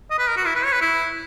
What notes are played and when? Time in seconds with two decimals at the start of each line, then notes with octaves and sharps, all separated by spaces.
0.10 D#5
0.19 B4
0.28 A#4
0.36 F#4
0.45 E4
0.55 B4
0.65 C#5
0.72 B4
0.81 E4